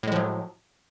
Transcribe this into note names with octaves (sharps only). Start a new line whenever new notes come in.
A2 F3 F#3 G#3